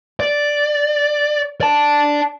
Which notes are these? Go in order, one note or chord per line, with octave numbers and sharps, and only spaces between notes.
D5
D5 A5